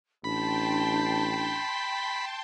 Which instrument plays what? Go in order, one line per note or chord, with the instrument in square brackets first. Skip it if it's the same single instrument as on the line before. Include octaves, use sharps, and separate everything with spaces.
[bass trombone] A1 [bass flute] D4 [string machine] G5 A5 C6 [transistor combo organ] B5